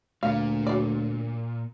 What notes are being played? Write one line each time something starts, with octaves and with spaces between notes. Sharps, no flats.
D2 A#2 F5
F#3 D5